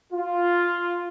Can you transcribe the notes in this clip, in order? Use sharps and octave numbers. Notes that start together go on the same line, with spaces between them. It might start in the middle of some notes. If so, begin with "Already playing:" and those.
F4